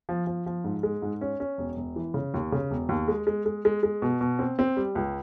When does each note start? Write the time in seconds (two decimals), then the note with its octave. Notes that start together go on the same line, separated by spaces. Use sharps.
0.09 F3
0.27 F3
0.46 F3
0.64 G#2
0.83 G#3
1.02 G#2
1.21 C#4
1.40 C#4
1.58 E1
1.77 E1
1.96 E3
2.14 C#3
2.34 D#2
2.52 C#3
2.71 E1
2.89 D#2
3.08 G#3
3.27 G#3
3.46 G#3
3.65 G#3
3.83 G#3
4.02 B2
4.21 B2
4.39 C4
4.59 C4
4.77 G3
4.95 C#2